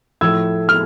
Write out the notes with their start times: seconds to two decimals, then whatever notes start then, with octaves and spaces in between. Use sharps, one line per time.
0.21 A2 F3 A3 E6 G#6
0.69 F6